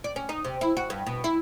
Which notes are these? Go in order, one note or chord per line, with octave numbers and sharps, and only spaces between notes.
D5
C#4
D#4
C3
E4
F#4
G2
B2
E4